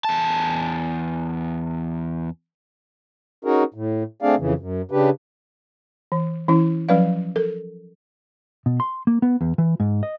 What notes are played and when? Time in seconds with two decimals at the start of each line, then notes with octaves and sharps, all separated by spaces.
0.05 E2 A5
3.45 C#4 D#4 F#4 G#4 A#4
3.74 A2
4.22 A3 C4 D4 G#4 D5 F5
4.39 F2 C#3 E3
4.58 F#2
4.91 C#3 D4 G4 B4
6.12 E3
6.48 E3 C#4 E4
6.89 F3 F#3 C#4 B4 D5 F5
7.36 A4 A#4
8.66 B2
8.80 C6
9.07 A#3
9.22 B3
9.41 E2
9.58 E3
9.80 G#2
10.03 D#5